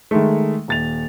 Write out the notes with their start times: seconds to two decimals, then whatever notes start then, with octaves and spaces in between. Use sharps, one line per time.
0.11 D#3 G#3 A3
0.68 D#1 A6 F7